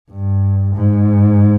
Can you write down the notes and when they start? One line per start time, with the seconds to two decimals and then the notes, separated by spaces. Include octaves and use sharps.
0.11 G2
0.74 G#2